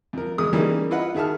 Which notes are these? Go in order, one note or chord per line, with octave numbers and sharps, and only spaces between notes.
F2 A#4
E2 G#3 D#6
E3 G3 A#3 C#4 D#4 G#4
E4 F4 B4 D#5 F#5
D#3 G#4 E5 A5 F6